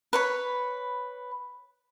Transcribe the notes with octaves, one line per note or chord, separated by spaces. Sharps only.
B4 C#5 B5